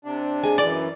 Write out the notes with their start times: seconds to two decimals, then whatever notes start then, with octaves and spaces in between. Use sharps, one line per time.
0.05 C3 D4
0.44 G#4 D#5 G#5
0.58 F#2 E3 D5